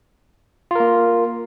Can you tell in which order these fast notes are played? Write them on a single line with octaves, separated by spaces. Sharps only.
F4 A#4 A#3